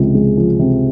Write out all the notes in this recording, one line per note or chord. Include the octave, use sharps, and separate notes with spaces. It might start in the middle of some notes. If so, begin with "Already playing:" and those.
Already playing: C#2 C3 F3
G#3
F3
C3